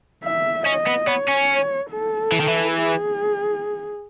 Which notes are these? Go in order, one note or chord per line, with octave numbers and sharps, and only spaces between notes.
E5
C#4 D#5
B3
B3 C#5
C#4
A4
E3
D#3
E3
G#4